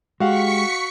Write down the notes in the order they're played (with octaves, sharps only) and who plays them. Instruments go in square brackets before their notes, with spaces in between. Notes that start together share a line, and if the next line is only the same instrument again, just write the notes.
[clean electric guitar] G#3 G4 [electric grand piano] F#4 F5 F#5 [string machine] C#6 B6 C#7